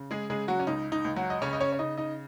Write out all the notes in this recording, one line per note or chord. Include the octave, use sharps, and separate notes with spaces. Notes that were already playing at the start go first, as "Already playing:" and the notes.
Already playing: C#3
G#3 G#4
C#3 G#3 G#4
F#3 F#4
C#4
C#2 D#4
D#4
C#2
F#3 F#4
D#5
C#3 C#4 C#5
D#5
C#4 C#5
C#5
C#3 D#4 D#5
D#4 D#5